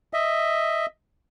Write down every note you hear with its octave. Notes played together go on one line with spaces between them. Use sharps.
D#5 E5